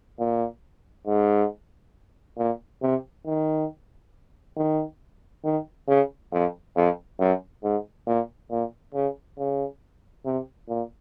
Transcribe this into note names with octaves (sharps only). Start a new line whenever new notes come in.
A#2
G#2
A#2
C3
D#3
D#3
D#3
C#3
F2
F2
F#2
G#2
A#2
A#2
C#3
C#3
C3
A#2